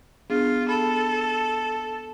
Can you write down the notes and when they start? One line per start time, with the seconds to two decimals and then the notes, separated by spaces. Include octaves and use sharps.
0.30 B3 D4 F4 G#4
0.68 A4 B5